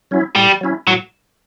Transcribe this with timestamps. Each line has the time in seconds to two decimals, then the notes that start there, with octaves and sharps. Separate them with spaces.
0.11 F#3 C#4 E4
0.36 A2 G3
0.61 F#3 C#4 E4
0.87 A2 F#3